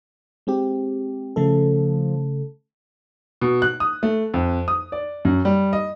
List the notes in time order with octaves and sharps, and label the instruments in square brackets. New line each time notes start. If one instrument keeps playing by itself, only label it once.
[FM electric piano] G#3 C4 G4
[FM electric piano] C#3 A3 A4 [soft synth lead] F3
[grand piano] B2
F#6
D#6
A3
F2
D#6
D5
F#2
G3
D#5